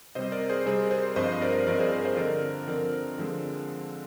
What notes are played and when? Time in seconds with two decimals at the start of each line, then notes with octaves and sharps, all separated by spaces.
0.15 C3 G3 C4 C5 D#5
0.32 A#4 D5
0.49 G#4 C5
0.66 C3 G3 C4 G#4 C5
0.91 G#4 C5
1.16 G2 F3 C4 C5 D#5
1.41 A#4 D5
1.67 G2 F3 C4 A#4 D5
1.80 G#4 C5
1.92 A#4 D5
2.05 C5 D#5
2.17 D3 F3 C4 A#4 D5
2.68 D3 F3 C4 A#4 D5
3.18 D3 F3 G#3 C4